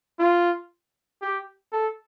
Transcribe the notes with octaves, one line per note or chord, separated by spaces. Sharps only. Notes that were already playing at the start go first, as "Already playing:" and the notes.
F4
G4
A4